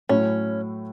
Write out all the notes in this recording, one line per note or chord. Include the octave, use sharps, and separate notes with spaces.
A2 F#3 A3 C#4 E4